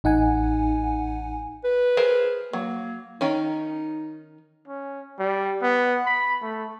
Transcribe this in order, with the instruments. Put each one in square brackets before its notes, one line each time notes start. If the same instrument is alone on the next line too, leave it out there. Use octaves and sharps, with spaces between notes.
[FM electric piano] A1 D#4 F#5 G#5
[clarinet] B4
[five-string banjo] G#4 A#4 C5
[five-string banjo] F#3 [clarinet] A#3
[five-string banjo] D#3 C#4 [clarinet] D#4
[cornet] C#4
G3
B3
B5
A3